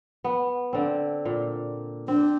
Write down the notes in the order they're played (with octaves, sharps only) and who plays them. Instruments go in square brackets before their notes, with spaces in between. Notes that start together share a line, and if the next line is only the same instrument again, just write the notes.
[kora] B3
D3 C4
A#2
[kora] C4 [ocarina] D4